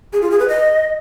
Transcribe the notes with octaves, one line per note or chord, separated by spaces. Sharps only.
G#4
F4
G#4
B4
D#5